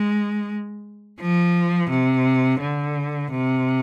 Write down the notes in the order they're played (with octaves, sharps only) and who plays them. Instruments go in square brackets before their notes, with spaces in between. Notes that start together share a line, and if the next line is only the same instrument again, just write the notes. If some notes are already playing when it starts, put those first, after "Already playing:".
Already playing: [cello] G#3
F3
C3
D3
C3